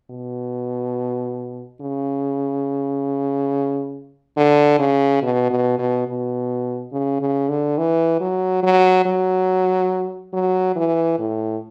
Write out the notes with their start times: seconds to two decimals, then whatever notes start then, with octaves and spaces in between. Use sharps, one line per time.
0.10 B2
1.81 C#3
4.37 D3
4.79 C#3
5.22 B2
5.50 B2
5.79 B2
6.07 B2
6.92 C#3
7.21 C#3
7.49 D3
7.78 E3
8.20 F#3
8.63 F#3
9.06 F#3
10.33 F#3
10.76 E3
11.19 A2